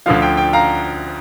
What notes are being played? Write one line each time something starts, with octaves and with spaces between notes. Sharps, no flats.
D2 D3 F3 F5
G5
G5
F5 A#5